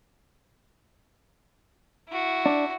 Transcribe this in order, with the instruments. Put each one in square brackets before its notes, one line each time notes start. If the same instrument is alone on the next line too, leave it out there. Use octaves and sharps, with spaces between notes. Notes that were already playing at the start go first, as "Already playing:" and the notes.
[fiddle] E4 F#4
[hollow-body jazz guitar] D4